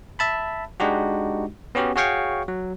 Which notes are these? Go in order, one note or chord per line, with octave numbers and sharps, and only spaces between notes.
E5 A5 B5
G#3 D4 D#4 F#4 G4
B3 C#4 F#4 G4
F#4 G#4 C#5 F5 G5 C#6
F#3